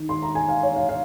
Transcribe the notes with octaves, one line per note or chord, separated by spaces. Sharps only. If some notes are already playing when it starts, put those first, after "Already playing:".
Already playing: D#3
C6
A#5
G#5
F5
C#5
F5
F5